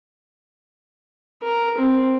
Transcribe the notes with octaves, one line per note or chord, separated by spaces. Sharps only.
A#4
C4